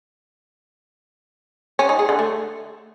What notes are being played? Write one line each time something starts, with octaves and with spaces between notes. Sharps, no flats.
C#4
D#4
G#4
D3
A3